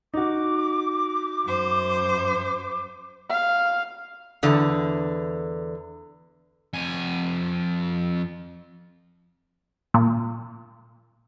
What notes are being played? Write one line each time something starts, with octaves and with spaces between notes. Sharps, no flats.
D#4 F#4 D6
F#2 C5
F5
E2 D3
F2 G#5
A#2